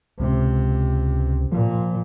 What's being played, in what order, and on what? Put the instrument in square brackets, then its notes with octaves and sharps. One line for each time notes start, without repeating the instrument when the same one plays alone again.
[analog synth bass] C#2 [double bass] C3
[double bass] A#2 [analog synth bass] F3